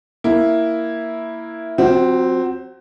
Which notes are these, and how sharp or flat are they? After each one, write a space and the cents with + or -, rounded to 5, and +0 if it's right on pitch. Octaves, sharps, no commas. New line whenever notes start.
A#3 +0 E4 +0
F#3 -45 C4 +0 F#4 +35